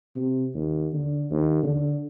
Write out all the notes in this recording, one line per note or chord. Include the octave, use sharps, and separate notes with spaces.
C3
D#2
D3
D#2
D3